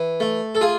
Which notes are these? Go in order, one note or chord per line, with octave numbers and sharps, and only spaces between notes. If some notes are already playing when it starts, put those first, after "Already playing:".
Already playing: E3
A3
A4
F4 G#4